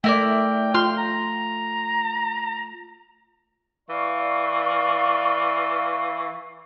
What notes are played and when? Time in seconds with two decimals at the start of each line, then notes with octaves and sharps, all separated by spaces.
0.04 A3 E4 A#4 D5 G5
0.74 F4 C6 F6
0.98 A#5
3.89 E3 D5 F5 C#6